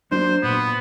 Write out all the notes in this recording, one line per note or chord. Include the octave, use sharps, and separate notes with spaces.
F#3 A#3 D4 C5
A#2 B3